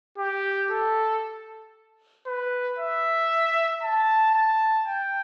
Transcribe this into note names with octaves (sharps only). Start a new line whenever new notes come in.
G4
A4
B4
E5
A5
A5
G5